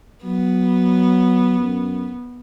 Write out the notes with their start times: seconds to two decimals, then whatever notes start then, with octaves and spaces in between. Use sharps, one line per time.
0.24 F#3 B3
1.60 F#2